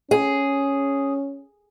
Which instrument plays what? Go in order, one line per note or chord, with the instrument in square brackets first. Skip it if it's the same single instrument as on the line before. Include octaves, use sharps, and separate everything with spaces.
[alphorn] C#4 [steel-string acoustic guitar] G#4